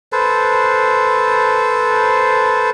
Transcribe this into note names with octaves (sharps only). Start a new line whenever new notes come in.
A4 B4 C5